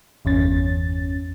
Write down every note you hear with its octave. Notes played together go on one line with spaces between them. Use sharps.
G1 E2 C#4 A6